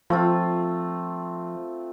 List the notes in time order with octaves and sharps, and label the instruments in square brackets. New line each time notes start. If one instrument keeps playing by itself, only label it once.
[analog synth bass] F3 [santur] A3 C4 F4